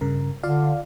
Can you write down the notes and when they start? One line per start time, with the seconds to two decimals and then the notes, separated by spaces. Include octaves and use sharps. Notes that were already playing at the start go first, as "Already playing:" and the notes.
0.01 G2 C#3 A#4
0.43 D3 F4 D5 F5